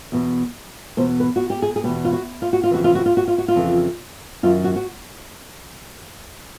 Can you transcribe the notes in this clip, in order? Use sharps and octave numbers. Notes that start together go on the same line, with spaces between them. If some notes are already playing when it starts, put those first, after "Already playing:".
E2 B2
E2 B2 C5
B4
F#4
G4
G#4
G#4
E2 B2 G4
F4
F#4
F4
F#4
F4
F2 C#3 E3 F#4
F4
F#4
F4
F#4
F4
F#4
F4
F2 C#3 E3
F#2 D#3 F4
F#4
F#4